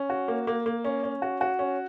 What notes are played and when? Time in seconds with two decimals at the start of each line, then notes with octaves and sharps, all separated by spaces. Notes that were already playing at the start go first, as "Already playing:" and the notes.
Already playing: C#4
0.10 F#4
0.28 A#3
0.47 A#3
0.66 A#3
0.85 C#4
1.03 C#4
1.22 F#4
1.41 F#4
1.59 C#4